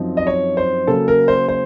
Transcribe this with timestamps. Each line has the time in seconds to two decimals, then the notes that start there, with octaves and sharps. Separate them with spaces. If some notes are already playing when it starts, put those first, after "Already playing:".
Already playing: F#2 F3 C4 D#4
0.17 D#5
0.27 C#5
0.57 C5
0.87 C#3 F#3 A#3 A4
1.08 A#4
1.28 C5
1.48 C5